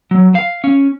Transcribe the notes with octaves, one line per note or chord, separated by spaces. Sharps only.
F#3
F5
C#4